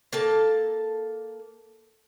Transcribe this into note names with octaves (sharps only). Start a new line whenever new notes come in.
A#3 A4 A5